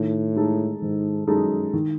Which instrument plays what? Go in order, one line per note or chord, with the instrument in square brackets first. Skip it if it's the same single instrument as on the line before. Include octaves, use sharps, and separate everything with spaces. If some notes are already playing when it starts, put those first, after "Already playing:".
Already playing: [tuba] A2 [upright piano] D#3
[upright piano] G#3 D#4 A4
[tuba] G#2 [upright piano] D#3
[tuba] F#2 [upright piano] G#3 D#4 A4
[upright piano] D#3